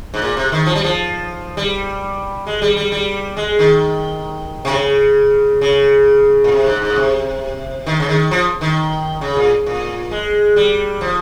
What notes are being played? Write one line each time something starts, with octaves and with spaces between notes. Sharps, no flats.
G#2
A#2
C3
D#3
F3
G3
F3
G3
G#3
G3
G3
G3
G#3
D#3
C3
C#3
C#3
A#2
C3
G#2
G#2
A#2
C3
D#3
C#3
D#3
F3
D#3
C#3
A#2
A#2
G#3
G3
F3